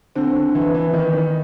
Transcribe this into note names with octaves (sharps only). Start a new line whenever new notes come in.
D3 C4
D3
E3
E3
D#3
D#3